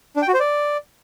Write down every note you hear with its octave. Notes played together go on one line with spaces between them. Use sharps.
D4
G5
F#4
C5
D5